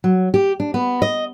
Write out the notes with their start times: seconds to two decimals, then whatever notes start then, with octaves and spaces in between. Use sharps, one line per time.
0.04 F#3
0.34 G4
0.60 D4
0.74 B3
1.02 D#5